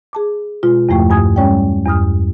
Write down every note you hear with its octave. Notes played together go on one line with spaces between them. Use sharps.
G#4 A5 D6
B2 G#3 F4
E2 G2 F3 A3 G5 C#6
G2 G#5 D#6 G#6
G3 G#3 C#4 C#5 D5 G5
E2 G2 D#6 F6